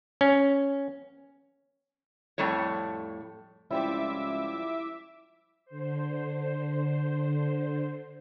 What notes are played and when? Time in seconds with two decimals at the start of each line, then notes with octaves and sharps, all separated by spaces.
0.21 C#4
2.38 F2 A2 G3 A4 C#5
3.71 C#2 F3 G3 C4 E4 E5 D6
5.65 D3 C5